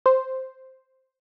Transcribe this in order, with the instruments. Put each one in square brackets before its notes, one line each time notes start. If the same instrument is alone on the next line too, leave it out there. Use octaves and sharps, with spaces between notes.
[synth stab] C5